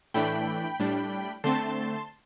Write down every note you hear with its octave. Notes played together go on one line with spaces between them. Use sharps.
A2 E3 A3 D4 G5 B5
A2 G3 D4
D3 A3 C4 A5 C6